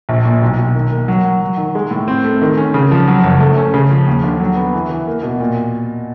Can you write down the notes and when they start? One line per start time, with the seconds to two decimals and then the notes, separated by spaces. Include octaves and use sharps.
0.09 A#1
0.25 A#2
0.42 B1
0.59 B1
0.74 D#3
0.92 A#3
1.08 F#3
1.24 F#3
1.41 F#3
1.57 D#3
1.75 G#3
1.91 A2
2.08 C4
2.24 A3
2.41 D#3
2.57 C#4
2.74 C#3
2.91 F3
3.08 F#3
3.23 F#1
3.40 A3
3.57 C#4
3.74 C#3
3.91 F3
4.07 D#2
4.24 D3
4.40 F#3
4.56 B3
4.73 E3
4.90 E3
5.07 A#3
5.23 B2
5.40 A#2